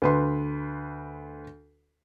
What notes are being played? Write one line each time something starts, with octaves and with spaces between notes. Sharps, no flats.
D2 B4 C6